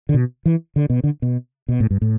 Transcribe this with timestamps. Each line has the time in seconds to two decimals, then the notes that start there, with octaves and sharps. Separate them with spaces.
0.09 D3
0.14 B2
0.46 E3
0.76 D3
0.90 B2
1.04 D3
1.22 B2
1.68 B2
1.80 A2
1.91 G2
2.02 A2